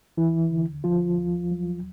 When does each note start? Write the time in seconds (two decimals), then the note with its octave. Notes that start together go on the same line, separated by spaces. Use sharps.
0.17 D#2 E3 E4
0.50 D3
0.84 D#2 F3 F4
1.18 D#2
1.51 F#3